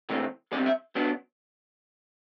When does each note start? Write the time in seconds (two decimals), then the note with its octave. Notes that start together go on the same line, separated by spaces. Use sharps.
0.09 C3 E3 A3 C4
0.52 E2 C3 G3 C4 D5
0.66 E5
0.95 F#2 F#3 B3 D4